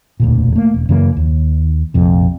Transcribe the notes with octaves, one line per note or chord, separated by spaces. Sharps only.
E1 D2 A#2
A3 A#3
E1
F#2 C#3 E3 A#3
D#2
A#1 F2 C3